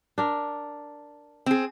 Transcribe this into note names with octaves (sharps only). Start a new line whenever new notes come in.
D4 A#4
C4 G#4